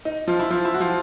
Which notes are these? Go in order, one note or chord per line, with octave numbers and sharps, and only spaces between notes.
D#4
F3 F4
E4
F3 F4
E4
F#4
F3 F4